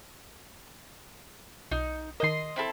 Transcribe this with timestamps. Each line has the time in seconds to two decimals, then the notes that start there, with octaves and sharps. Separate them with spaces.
1.71 B1 D#4
2.20 D#3 A#4 D#5 G5 C6
2.56 C4 E4 A4